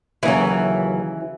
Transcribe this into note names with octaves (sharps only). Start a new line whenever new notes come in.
D#2 C#3 E3 F#3